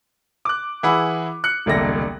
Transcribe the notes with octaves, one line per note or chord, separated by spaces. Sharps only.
D6 F#6
E3 E4 G#4 F#5 B5
F#6 C#7
E1 C2 D3 A#3 A#6